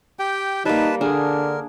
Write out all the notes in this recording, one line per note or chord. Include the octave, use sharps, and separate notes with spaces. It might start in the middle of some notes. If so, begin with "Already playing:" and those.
G4 G5
G3 A#3 D#4 B4 A5
D3 D4 G#4 A#4